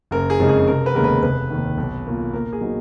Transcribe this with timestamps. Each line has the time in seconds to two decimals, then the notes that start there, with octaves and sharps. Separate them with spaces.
0.11 F#1 A#4
0.30 G#4
0.39 F2 C#3 G#3 D#4
0.49 G#4
0.67 F1 A#4
0.86 B4
0.95 D#2 C#3 G#3 B3 A#4
1.04 B4
1.23 F1 B4
1.50 D#2 D#3
1.77 B1
2.06 B2 A#3 F4
2.33 A#2 A#4
2.53 G#4
2.61 F#3 B3 D#4